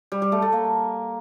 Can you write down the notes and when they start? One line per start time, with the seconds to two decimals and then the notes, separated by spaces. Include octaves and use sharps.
0.12 G3
0.22 G3
0.32 A3
0.42 A3
0.52 A#3